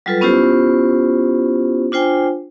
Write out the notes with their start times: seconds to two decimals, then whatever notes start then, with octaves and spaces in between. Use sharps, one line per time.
0.06 F#3 G3 F4 A4 B4
0.21 B3 C#4 E4 F4 G4 C5
1.92 D4 F4 C5 G5 G#5